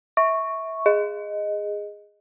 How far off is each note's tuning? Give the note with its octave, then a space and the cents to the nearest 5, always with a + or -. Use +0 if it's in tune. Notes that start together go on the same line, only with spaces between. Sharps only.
E5 -20 C#6 +0
G#4 -10 D#5 +0